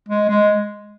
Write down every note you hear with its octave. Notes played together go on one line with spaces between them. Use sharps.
G#3
G#3